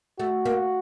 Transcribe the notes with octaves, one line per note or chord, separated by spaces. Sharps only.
A3 F#4
A#3